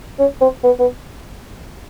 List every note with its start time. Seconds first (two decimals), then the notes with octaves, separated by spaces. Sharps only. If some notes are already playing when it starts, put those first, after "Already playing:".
0.19 C#4
0.41 C4
0.64 B3
0.79 B3